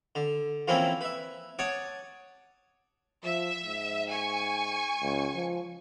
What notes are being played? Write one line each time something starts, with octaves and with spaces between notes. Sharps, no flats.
D3
E3 F3 A#3 C4 C#4 E4
B4 E5
C#5 F#5 A5 D6 D#6
F3 E5
G#2
G#5 C#6
C#2
F3